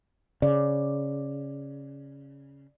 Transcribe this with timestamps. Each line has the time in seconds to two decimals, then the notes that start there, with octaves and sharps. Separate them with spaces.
0.42 C#3 D5